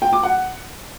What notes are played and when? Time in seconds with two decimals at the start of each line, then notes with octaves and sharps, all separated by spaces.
0.02 G5
0.13 D6
0.23 F#5